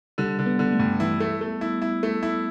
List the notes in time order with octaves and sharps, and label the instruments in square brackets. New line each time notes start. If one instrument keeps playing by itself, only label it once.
[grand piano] D3 [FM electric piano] G3
[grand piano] D3
[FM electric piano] B3
[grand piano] D3
[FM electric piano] A3
[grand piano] G2
[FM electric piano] E3 [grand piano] E4
[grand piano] A3
A3
E4
E4
A3
E4